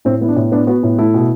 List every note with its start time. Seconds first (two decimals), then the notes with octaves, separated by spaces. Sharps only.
0.05 A2 C4
0.21 B3 E4
0.29 D4
0.36 A2
0.52 B3 D4
0.67 B3 F#4
0.83 A2
0.98 A3 E4
1.14 B2